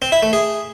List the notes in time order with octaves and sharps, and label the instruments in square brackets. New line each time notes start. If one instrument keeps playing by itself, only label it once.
[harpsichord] C4
E4
A3
G#4